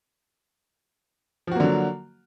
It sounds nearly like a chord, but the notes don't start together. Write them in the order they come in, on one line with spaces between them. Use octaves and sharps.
F3 F#4 A#3 D3 F#3